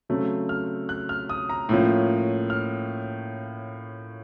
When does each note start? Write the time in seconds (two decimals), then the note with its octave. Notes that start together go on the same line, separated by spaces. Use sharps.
0.09 C#3 F#3 A3 C4
0.49 F6
0.89 F#6
1.09 F6
1.29 D#6
1.49 A#5
1.69 A2 F3 A#3 C#4
2.50 F6